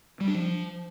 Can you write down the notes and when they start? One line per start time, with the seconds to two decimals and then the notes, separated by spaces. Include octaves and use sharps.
0.20 G3
0.28 D4
0.35 F3